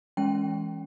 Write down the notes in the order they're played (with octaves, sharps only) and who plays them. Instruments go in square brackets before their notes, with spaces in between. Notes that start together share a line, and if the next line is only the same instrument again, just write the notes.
[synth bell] E3 G#3 C#4 G5